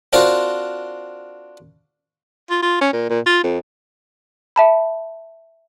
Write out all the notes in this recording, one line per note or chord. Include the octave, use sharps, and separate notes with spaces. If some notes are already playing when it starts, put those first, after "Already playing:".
C4 D4 F4 F#4 A#4 C5
F4
F4
C#4
A#2
A#2
F4
F2
E5 A5 B5